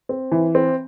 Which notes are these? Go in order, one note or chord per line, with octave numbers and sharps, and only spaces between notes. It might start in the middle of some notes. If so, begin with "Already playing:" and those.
C4
E3
C4